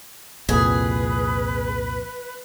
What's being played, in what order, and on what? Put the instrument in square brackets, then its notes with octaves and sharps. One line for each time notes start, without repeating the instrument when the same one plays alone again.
[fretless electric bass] C2 F2 A#2 [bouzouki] G#4 [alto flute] B4